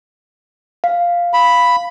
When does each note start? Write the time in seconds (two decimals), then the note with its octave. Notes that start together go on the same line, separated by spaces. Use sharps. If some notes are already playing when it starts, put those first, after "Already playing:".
0.84 F5
1.33 B5